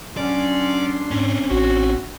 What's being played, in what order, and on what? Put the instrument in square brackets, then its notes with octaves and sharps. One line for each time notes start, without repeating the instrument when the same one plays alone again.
[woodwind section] F#3 C#4 [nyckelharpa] D4 C6 [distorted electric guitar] D5
[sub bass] G#2 [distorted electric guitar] C4 C#4
[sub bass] A1 [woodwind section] F#4